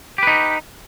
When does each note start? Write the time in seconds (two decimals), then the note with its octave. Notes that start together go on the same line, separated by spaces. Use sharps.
0.18 G4
0.23 B4
0.27 D#4